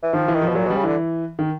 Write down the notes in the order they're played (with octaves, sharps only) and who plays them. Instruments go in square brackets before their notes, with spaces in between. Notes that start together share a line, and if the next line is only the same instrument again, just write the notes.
[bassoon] E3
[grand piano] D#3 [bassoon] F3
[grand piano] E3
[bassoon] D#3
[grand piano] F3
[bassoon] B2
[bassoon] A#2 [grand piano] F#3
[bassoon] B2 [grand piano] G3
[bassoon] C#3
[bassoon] D3 [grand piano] E3
[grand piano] D#3